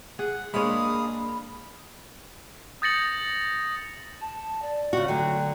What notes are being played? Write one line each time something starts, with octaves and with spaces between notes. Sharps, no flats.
G#4 F#5
G#3 A#3 D4 G#4 C#5 F5 B5 D#6
D#6 G6 A6 A#6 C#7 F#7
A5
D5
C#3 F#4
D3 F#3 A3 G5